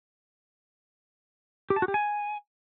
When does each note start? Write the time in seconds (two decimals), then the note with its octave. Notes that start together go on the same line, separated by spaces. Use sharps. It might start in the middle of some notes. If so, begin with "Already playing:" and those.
1.70 G4
1.76 A5
1.82 F#4
1.88 G4
1.94 G#5